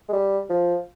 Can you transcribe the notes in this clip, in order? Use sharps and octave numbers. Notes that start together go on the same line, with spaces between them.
G#3
G3
F3